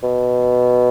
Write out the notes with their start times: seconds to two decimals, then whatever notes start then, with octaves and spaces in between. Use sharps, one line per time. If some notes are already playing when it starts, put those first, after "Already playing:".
0.03 B2